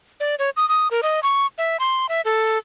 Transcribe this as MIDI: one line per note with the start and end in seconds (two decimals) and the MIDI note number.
0.20 0.35 74
0.39 0.50 73
0.57 0.68 87
0.69 0.88 87
0.91 1.01 70
1.03 1.20 75
1.23 1.46 85
1.58 1.77 76
1.80 2.06 84
2.09 2.21 76
2.25 2.58 69